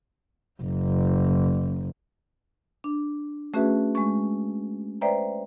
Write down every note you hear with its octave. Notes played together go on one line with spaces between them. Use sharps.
F#1
D4
A3 C#4 F#4 G#4 B4 E5
G#3 C#6
B4 C5 D5 E5 G5 A#5